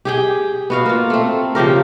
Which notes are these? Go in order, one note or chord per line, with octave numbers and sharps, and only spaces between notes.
G4 G#4 G5
B3 F#4 F5
A#3 F4
A3 C4
C#3 F3 G4 A#4